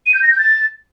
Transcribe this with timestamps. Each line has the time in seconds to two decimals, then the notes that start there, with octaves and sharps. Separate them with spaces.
0.06 D#7
0.14 G6
0.22 A#6
0.30 G6
0.38 A6